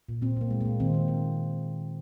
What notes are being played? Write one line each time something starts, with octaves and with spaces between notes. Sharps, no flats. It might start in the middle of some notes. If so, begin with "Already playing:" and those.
A#2
A#2 C4
A#2 A#3
G#3
A#2 A#3
D#3 C4
A#3
A#3